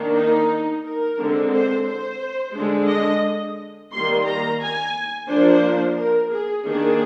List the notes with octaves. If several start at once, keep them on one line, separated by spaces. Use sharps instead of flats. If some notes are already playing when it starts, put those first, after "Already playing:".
Already playing: D#3 A#3 D4
D#4
A#4
D3 G#3 C4
C5
C5
D3 G#3 D4
D#5
D#3 G3 A#3 C6
A#5
G#5
F3 A#3 D4 C5
A#4
G#4
D#3 A#3 D4 G#4